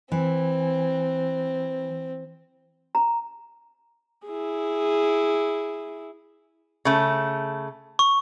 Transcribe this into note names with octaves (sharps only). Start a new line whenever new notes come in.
E3 C4
A#5
E4 G#4
C#3 A3
C#6